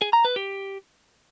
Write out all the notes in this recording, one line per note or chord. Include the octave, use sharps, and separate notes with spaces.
G#4
A#5
B4
G4